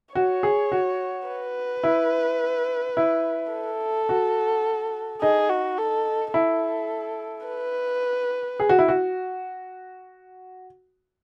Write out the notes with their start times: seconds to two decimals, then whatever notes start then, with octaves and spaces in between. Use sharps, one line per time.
0.15 F#4 C#5
0.43 G#4
0.72 F#4
1.28 B4
1.83 E4
2.97 E4
3.52 A4
4.09 F#4
5.22 D#4 G#4
5.49 F#4
5.78 A4
6.33 E4 A4
7.46 B4
8.60 G#4
8.69 F#4
8.79 E4
8.88 F#4